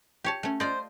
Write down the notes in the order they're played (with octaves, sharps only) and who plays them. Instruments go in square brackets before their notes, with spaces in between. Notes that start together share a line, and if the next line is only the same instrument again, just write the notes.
[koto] G4 C#5 A5
A3 C#4
[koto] F4 D5 D#5 [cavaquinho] C5